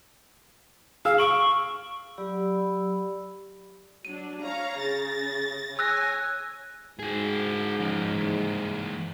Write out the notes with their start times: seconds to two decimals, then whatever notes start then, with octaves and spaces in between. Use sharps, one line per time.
1.05 G#4 F5 E6 F6
1.18 C#6 E6 D7 F#7
2.18 F#3 G4 D5 B5 E6
4.05 F#3 D4 D#7
4.42 C#5 F5 A#5
4.79 C#3 A6 A#6
5.79 C#5 G#5 E6 F#6 A#6
6.99 G#2 F#4 G#4
7.80 F3 C#4
8.16 E3 A#3